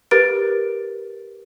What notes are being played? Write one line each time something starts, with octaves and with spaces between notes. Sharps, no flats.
G4 A#4 B4 A6 D7